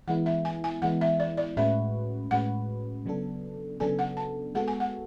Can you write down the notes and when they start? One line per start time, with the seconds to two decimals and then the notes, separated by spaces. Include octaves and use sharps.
0.08 E3 G#3 B3 E4 F#5
0.26 E5
0.45 G#5
0.64 G#5
0.82 E3 G#3 B3 E4 F#5
1.01 E5
1.20 D5
1.37 D5
1.57 A2 G#3 C#4 F#4 B4 E5
2.31 A2 G#3 C#4 F#4 B4 F#5
3.06 C#3 F#3 B3 D4 A4
3.80 C#3 F#3 B3 D4 A4 G#5
3.99 F#5
4.17 A5
4.55 G#3 B3 F#4 A4 F#5
4.68 G#5
4.80 F#5